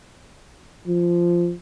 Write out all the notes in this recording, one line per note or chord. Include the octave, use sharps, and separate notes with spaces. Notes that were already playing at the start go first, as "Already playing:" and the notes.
F3